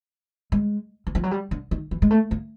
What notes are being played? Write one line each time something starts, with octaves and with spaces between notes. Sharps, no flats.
G#3
E3
F3
F#3
G3
D3
D#3
E3
G#3
A3
A#3